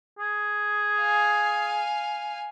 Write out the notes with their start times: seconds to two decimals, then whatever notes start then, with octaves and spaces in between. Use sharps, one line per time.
0.19 G#4
1.00 F5 G#5